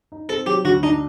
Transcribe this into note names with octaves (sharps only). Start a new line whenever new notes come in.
D#4
C4 A4
F#3 G4
D2 F#4
D4 D#4